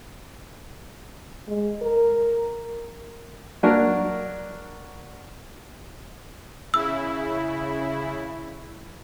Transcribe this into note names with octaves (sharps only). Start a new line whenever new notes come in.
G#3
A#4
F#3 A#3 D4 A#4
C#3 E4 E6